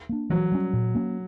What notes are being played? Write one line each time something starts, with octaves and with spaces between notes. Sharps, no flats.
A#3 D4
E3 F#3
G3 C#4
A#2
A#3 C#4